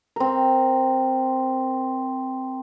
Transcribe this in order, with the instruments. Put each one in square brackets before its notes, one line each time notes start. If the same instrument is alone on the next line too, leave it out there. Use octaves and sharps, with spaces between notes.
[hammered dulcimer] C4 A#4